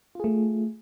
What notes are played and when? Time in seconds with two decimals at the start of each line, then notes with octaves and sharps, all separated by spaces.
0.15 F4
0.20 G#4
0.24 A3